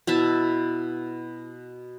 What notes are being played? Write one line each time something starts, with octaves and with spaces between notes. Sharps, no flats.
B2 E4 E5 A5